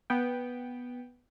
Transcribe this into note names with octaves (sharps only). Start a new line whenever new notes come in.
B3 G5